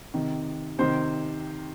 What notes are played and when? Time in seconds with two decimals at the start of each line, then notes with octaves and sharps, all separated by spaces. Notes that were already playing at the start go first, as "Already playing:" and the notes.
0.14 C3 D#3
0.79 C3 D#3 C5